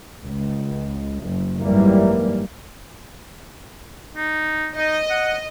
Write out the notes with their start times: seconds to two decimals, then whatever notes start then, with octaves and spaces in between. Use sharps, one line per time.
0.24 C#2
1.24 F#1
1.60 G#1 F#2 E3 G3 A#3
4.16 D#4
4.76 D#4 D#5
5.10 F#5